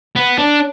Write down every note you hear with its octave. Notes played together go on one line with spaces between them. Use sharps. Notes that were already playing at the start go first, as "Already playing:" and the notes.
B3
D4